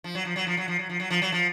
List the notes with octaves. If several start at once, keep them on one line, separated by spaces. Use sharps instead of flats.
F3
F#3
F3
F#3
F3
F#3
F3
F#3
F3
F#3
F3
F#3
F3